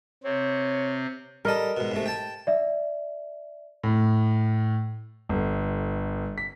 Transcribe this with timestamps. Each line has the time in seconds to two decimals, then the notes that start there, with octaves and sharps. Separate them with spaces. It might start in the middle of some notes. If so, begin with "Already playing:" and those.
0.24 C3 C4 C#5
1.45 G3 A4 A#4 D#5
1.77 G#2 B2
1.91 G#2 C3 A3
2.06 G5 A5
2.47 D5 E5
3.83 A2
5.29 G1
6.38 B6